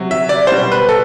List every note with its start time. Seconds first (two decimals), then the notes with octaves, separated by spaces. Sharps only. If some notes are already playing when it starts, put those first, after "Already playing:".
Already playing: C3 F#3
0.11 E5
0.29 D5
0.47 B2 G3 C5
0.72 B4
0.89 A4